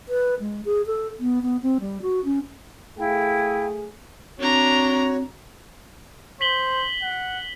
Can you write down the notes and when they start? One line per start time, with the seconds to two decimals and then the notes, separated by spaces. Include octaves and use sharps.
0.09 B4
0.40 G#3
0.65 G#4
0.86 A4
1.20 B3
1.43 B3
1.62 C4
1.80 G3
2.02 F#4
2.25 C#4
2.98 A3 E4 G#4 F5 G5
4.39 C4 D4 F#4 C#5 A#5
6.41 C5 B6 F#7 G7
7.03 F#5